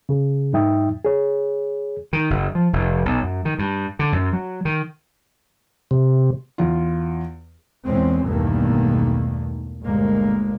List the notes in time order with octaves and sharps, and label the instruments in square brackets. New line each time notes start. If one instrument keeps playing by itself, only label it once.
[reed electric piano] C#3 G#4
G#2 F#3 D#4 E5 G5 D#6
G#4 C#5
[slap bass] D#3
F#1
F3
F1
B1
F#2
D#3
G2
D3
F#2
F#3
D#3
[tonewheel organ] C3
[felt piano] E2 F4
[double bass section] E2 A#2 E3 G#3 C4 C#4
B1 E2 G2 D#3 A3 A#3
G1 D2 A#2 G#3 A#3